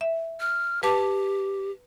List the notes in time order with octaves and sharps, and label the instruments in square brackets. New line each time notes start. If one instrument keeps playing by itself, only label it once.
[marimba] E5
[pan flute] F6
[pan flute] G4 [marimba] B4 A5 D6